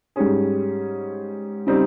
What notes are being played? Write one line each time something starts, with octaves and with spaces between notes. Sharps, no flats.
G#2 G3 C#4 G#4
C#3 G3 C4 D#4